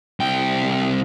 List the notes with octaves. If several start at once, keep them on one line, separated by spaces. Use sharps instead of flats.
C2 G5